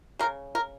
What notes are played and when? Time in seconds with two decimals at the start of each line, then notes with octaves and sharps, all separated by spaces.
0.19 C#3 G#3 A#4
0.55 A#4